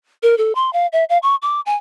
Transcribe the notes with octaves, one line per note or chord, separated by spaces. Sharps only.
A#4
A4
C6
F5
E5
F5
C#6
D6
G#5